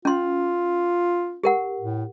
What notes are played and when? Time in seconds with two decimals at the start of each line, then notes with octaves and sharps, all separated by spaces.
0.05 C#4 F4 C6
1.44 G4 A#4 F#5
1.80 A2